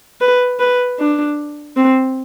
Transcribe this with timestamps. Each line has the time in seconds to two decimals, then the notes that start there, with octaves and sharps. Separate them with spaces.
0.21 B4
0.60 B4
0.99 D4
1.77 C4